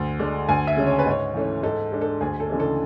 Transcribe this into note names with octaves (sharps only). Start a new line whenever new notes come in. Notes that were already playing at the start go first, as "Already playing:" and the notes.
Already playing: D2
D3 G#3 D4
D2 G#5
E5
C#3 G#3 C#4
C#5
B4
G#2 C#5
E3 A3 C#4
G#2 A4
G#3 D4
A4
D2 G#4
A4
C#3 E3 G#3 D4
A4